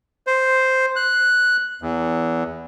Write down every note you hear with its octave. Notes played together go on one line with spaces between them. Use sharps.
C5
F#6
E2